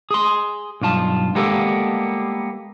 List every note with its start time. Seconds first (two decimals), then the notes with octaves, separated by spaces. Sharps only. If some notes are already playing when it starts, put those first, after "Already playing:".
0.11 G#4 C6
0.81 B1 G2 F4 A5
1.35 G3 G#3 A#3 B3 G4 A4